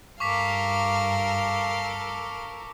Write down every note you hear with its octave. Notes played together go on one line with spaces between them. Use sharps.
G2 A4 A#4 F5 C#6 D6 B6